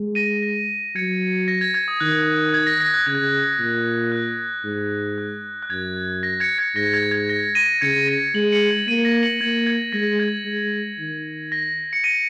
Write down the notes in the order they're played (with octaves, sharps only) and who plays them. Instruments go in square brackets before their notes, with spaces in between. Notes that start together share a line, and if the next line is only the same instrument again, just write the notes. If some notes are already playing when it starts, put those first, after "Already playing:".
Already playing: [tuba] G#3
[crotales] A#6 D#7
A#6
[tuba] F#3 [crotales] G#6 C#7
[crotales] A#6
G#6
G#6
D#6
[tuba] D#3 [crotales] F#6
[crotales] G#6
A#6
A#6
F#6
[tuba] C#3 [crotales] G#6
[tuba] A#2
[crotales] F#6
[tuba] G#2
[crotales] F#6
F#6
[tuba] F#2 [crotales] G#6
[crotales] A#6
G#6 C#7
G#6 C#7
[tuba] G#2 [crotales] A#6
[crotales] G#6
G#6
A#6
A#6 D#7
[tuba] C#3 [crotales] G#6 C#7
[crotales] A#6 D#7
[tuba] G#3 [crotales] C#7 F#7
[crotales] C#7 F#7
G#6 C#7
[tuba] A#3 [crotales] A#6 D#7
[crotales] A#6 D#7
C#7 F#7
[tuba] A#3 [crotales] G#6 C#7
[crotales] G#6 C#7
[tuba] G#3 [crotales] A#6
[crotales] G#6
[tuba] G#3
D#3
[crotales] A#6
C#7
A#6 D#7